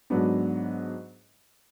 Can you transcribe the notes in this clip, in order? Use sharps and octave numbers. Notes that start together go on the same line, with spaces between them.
G#2 F#3 B3 D4